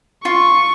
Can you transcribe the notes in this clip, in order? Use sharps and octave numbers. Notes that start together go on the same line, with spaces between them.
F4 C#6